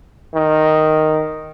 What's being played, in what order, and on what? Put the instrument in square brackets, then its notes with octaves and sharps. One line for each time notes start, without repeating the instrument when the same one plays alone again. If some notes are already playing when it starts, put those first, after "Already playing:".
[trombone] D#3